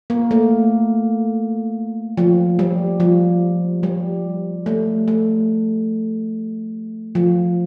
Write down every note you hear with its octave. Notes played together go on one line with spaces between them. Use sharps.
A#3
A3
F3
G3
F3
G3
A3
A3
F3